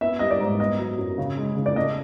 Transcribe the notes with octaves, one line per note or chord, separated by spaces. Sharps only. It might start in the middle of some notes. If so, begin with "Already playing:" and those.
B3 E5
G3 D#5
D5
G#2
B3 D#5
F#3
F#2
C#3
G#3
C#3
D5
A3 D#5